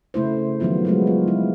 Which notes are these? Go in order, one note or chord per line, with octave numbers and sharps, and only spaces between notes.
C#3 A3 E4 C5
D#3 F3 F#3 B3 F4
F#3 G#3 B3
F4
E4